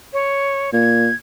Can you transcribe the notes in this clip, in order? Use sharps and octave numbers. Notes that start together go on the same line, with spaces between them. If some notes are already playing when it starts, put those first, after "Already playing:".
C#5
A#2 G#6